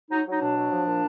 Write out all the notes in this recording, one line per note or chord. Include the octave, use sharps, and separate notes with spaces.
F#3 D#4
F#3 D#4
B2 D4
F#3
F3
A#2